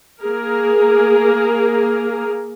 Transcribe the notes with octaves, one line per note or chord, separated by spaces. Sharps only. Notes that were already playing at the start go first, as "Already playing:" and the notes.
A#3 G#4 A#4